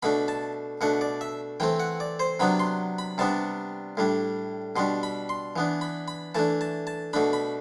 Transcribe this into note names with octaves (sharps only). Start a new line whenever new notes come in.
B2 A3 D4 B5
A5
B2 A3 D4 F#5
D5
E5
E3 A3 C4 G5
F#5
D5
C5
C3 F#3 B3 D4 B5
C6
B5
C3 G3 B3 D4 A5
A2 G3 D4
B2 G3 D4 C6
B5
C6
E3 B3 D4
B5
B5
E3 A3 D4 A5
A5
A5
B2 A3 D4 B5
B5